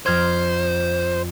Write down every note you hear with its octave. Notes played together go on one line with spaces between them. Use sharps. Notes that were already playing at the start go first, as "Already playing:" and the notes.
F2 C5 F6 G#6